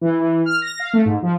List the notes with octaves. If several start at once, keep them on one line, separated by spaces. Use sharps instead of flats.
E3
E3
F6
A#6
F5
A3
G#2
F3